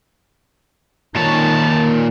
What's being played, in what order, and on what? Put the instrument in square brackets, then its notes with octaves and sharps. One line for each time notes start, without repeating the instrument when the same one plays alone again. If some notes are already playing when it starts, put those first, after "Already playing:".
[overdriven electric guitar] A#2 C#5 [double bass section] D#3 [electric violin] A5